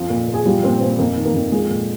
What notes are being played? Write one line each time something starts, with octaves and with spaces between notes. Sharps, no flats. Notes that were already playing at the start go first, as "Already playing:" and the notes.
Already playing: F2 F3
A#2
A#2
G#4
F3 G3 G4
A#2 C4 C5
A#2 C4 C5
F2 A#3 A#4
D#3
A#3 A#4
F2
F3 G#3 G#4
A#2